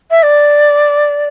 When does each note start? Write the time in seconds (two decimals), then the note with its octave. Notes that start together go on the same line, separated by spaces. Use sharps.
0.11 E5
0.23 D5